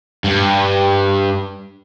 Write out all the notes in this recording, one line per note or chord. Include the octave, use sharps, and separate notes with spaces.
G2